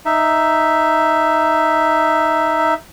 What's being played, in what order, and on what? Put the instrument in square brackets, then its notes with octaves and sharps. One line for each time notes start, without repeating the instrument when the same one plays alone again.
[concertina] D#4 E5